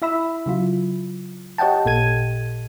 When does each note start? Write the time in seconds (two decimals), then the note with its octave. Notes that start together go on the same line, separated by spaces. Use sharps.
0.02 E4 E5 B5 E6
0.46 C#3 F#3 F4
1.58 G4 C#5 D#5 F#5 G5 A5
1.85 A1 A#2 A4 G#6 D#7